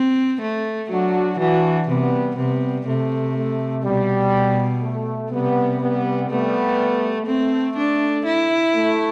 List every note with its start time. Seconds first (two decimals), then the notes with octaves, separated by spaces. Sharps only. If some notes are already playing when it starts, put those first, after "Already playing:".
Already playing: C4
0.41 A3
0.90 F#3 D4 F#4
1.39 E3 D4 F#4
1.88 C3 G3 B3
2.37 C3 G3 B3
2.86 C3 A3
3.35 A3
3.84 B2 G3
4.83 A3
5.31 C3 G3 B3
5.80 G3 B3
6.29 G3 A3 B3
7.27 A3 C4
7.77 D4
8.26 E4
8.74 A3